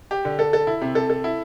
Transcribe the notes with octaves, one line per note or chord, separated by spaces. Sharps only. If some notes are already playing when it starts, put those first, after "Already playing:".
G4
D3
A4
A4
E4
C3
A4
A4
E4